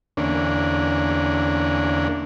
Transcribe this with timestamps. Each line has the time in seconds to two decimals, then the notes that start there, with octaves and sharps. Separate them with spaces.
0.17 E2 D3 A#3 C#4 D4